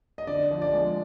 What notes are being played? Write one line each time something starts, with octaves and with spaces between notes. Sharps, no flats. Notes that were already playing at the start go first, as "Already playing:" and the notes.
D#5
D3 D5
F3
D5
G#3